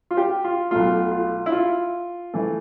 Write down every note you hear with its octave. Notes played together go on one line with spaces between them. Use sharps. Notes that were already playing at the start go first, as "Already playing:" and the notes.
F4
G4
F4
B1 B2 A3 F4
F4
E4
F4
E3 A3